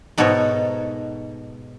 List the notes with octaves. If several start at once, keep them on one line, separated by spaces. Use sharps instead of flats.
G#2 B2 D#4 A4 C#5